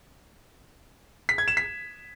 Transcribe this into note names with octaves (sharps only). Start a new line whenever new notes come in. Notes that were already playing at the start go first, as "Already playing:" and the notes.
B6
G#6
E7
B6